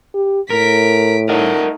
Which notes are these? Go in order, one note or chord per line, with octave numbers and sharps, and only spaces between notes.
G4
A2 A#4 B6 D7
A3 D#4 A#4 D#5 F#5